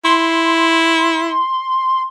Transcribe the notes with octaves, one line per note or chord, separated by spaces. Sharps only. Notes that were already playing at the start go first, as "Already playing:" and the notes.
E4 C6